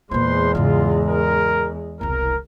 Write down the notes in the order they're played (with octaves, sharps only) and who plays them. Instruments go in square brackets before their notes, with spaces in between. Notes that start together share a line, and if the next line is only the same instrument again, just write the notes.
[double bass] E2 G#3 [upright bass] A#2 F4 [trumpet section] B4 C5 C6
[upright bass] G#2 C#3 [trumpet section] F4
[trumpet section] A#4
[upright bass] E1 C2 [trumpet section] A#4